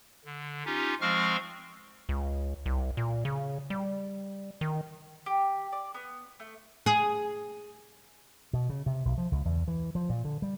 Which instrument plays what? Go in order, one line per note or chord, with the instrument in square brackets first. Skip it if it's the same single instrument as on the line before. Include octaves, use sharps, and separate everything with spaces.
[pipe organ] D3
C#4 D#4 F4 G4
F3 G#3 C4 F5 C#6 F6
[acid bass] C#2
C2
A#2
C#3
G3
D#3
[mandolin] G4
D5
B3
A3
[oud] G#4
[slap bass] B2
C#3
C3
B1
F3
C#2
E2
E3
F3
A#2
D3
G3